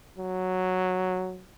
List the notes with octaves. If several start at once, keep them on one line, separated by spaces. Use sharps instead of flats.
F#3